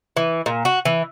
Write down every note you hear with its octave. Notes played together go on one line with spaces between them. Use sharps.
E3
A#2
F#4
E3